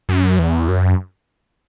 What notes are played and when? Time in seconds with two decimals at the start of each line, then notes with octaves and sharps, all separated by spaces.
0.09 F#2
0.39 E2
0.68 F#2